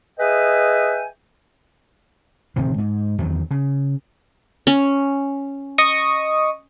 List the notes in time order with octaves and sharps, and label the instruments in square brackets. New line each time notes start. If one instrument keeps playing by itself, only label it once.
[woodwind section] G#4 B4 D#5 E5 G5 G#5
[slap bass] D1 C3 D#3 F3
G#2
E2 D#3 F#3
C#3
[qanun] C#4
[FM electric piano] D#5 C#6 D#6